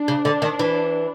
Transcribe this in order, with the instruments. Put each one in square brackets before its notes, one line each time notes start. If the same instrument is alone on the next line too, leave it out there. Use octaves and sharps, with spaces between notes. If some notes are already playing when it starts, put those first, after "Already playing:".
Already playing: [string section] D4
[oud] C#3
D3
D#3
E3